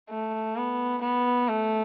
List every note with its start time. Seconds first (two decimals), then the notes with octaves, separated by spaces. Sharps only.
0.10 A3
0.57 B3
1.02 B3
1.48 A3